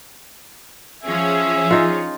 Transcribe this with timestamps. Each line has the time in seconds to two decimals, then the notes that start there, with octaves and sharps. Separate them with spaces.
1.03 F3 C#4 G#4 E5
1.71 D#4 F4